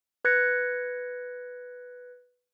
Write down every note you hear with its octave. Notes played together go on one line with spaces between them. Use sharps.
B4 F#6 G#6 A#6 C#7